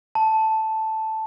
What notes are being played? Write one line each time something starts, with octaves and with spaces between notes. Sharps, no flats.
A5